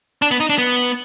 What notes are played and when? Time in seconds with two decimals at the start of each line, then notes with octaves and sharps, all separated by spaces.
0.22 D4
0.31 B3
0.40 D#4
0.49 D4
0.58 B3